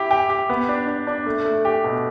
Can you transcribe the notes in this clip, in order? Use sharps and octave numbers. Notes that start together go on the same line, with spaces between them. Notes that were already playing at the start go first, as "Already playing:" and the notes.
Already playing: E4 G4
G4
G4
B3
D4
D4
D4
A3
A3
G4
B2